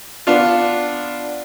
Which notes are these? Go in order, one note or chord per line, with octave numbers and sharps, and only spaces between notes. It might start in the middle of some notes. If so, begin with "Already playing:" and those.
B3 D4 F4